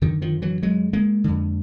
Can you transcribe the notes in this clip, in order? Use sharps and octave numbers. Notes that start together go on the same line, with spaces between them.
F#2 D3 D#3
D#3 F3
E3 F#3
F#3 G#3
G#3 A#3
F2 D3